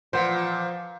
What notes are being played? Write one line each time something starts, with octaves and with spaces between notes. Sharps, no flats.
A#2 E3 F3 C5 F#5